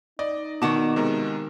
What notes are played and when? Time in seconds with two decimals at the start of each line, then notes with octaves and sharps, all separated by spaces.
0.19 D#4 D5 D#5
0.62 B2 D#3 F#5 A5 C#6 D6
0.96 C3 G#3 A#4